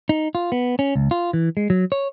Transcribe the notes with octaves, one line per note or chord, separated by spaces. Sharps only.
D#4
F4
B3
C#4
C#2
F4
E3
G#3
F#3
C#5